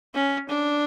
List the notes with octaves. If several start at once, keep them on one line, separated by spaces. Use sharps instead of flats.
C#4
D4